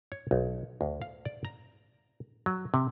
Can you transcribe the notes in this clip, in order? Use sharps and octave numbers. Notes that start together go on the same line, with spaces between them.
C#5
B1
D2
F5
D5
A#5
F#3
C3